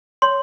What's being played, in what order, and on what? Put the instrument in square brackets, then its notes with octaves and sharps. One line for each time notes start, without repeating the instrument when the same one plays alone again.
[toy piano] C#5 C6